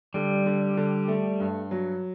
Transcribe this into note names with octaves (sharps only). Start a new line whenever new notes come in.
D3 G3
D3
D3
A3
G2
F#3